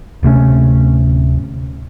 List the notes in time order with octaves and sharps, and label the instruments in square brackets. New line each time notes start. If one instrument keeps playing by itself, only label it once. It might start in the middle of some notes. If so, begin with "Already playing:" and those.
[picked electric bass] D1 C3 A3 C#4